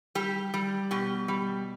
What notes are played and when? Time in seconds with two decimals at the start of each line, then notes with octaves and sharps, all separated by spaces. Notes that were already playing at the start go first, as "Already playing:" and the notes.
0.15 G3 G4
0.54 G3
0.91 B2 G4
1.28 G3